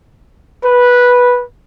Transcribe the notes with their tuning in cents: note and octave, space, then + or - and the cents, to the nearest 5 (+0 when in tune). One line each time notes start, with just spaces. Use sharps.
B4 -10